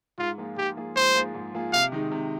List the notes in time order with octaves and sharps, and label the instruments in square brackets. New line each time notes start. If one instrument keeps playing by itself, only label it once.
[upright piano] G#2 [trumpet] F4
[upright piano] F3 A#3 F4 G#4
[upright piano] G#2 [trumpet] G4
[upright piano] F3 A#3 F4 G#4
[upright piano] G#2 [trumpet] C5
[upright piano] F3 A#3 F4 G#4
G#2
F3 A#3 F4 G#4
[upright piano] C3 [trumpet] F5
[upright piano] D#3 G#3 D#4
C3